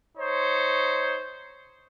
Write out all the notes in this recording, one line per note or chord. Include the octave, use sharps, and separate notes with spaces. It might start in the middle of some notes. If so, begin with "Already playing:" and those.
D#4 C5 C#5